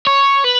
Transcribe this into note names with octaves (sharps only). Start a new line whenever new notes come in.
C#5
B4